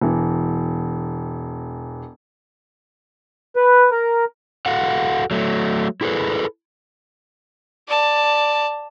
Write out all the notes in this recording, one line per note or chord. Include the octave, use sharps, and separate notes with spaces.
E1 E3
B4
A#4
F#4 A4 F5 F#5
F#3 A3
E4 G#4 A4 B4
D5 A5